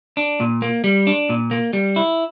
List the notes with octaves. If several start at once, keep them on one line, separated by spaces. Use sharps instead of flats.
D4
A#2
A#3
G3
D4
A#2
A#3
G3
E4